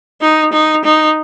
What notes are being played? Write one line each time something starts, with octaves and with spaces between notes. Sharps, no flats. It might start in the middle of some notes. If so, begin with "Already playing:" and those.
D#4
D#4
D#4